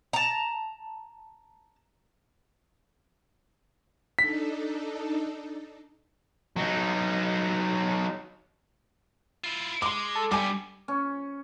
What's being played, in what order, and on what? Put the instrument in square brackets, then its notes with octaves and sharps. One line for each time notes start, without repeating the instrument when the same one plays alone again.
[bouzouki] A5 A#5
[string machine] D4 D#4 A4 [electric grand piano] B6
[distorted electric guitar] F#3 D#4
E4 F4
[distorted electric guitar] G#3 [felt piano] C6 D6
[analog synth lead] A4
[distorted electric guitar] G2 B3 [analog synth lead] G3 [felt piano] G#5 D6
[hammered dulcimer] C#4